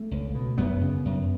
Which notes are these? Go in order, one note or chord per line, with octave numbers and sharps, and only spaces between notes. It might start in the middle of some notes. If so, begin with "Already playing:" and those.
Already playing: A3
C#2
B2
F#2 B3
C#3
F#2